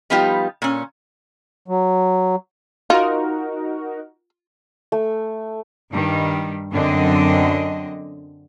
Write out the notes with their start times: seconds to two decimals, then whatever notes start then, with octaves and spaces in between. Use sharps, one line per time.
0.10 F3 G3 B3 D#4 F4 G4
0.62 A#2 C#4
1.68 F#3
2.90 D#4 F4 F#4 A#4
4.92 A3
5.92 G2 D#3 G3
6.72 F#2 D3 C4 D4 D#5